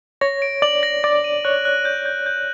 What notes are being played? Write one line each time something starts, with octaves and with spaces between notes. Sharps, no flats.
C#5 A#6
D7
D5 F#7
A#6
D5 A#6
D#7
C#5 F#6
F#6
G6
G6
G6